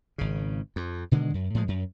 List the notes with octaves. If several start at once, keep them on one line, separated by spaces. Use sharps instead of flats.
G#1 C#3
F2
B2 D3 D#3 G#3
F#2
A2 F3 G#3
F#2